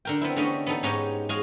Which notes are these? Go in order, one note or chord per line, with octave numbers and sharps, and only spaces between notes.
D3 A#4 G5
B3 C4 E4
D3 A3 C#4 G4 D#5
B3 D#4 A4
G#2 G#3 C#4 D#4 G4 D#5
G#3 F#4 G#4 D#5 F5